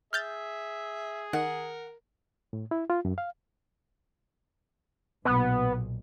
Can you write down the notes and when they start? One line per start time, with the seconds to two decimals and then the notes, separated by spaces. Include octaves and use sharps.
0.13 G#4 E5 F6 G6 A6
1.33 D#3 A#4 F#5
2.53 A2
2.71 E4
2.90 F4
3.05 F#2
3.18 F5
5.25 B1 A#2 B3